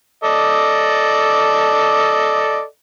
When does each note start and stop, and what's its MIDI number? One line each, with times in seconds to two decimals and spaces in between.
0.24 2.63 69
0.24 2.63 74
0.24 2.63 75